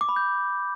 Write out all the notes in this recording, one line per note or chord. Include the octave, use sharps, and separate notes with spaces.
D6
B5
G6